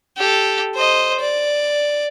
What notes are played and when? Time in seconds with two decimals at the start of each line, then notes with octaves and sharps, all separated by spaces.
0.18 G4 A4
0.75 C5 D#5
1.20 D5